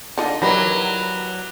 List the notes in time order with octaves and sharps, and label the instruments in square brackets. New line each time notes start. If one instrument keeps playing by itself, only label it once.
[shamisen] D3 D4 [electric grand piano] D#4 F4 D#5
[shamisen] D3 A#4 [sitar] F#3 [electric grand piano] E4 G4 A#6 [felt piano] B4 B5